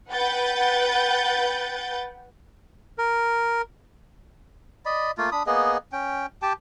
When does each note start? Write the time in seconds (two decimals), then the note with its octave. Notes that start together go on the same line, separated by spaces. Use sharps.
0.12 B4 F#5 G5 G6 A6
2.98 A#4
4.85 D5 D#5 B5
5.18 A3 A#3 F4
5.32 D4 B5 D#6
5.47 A#3 B3 G#4 D#5
5.92 C#4 G5
6.42 G4 G5 A5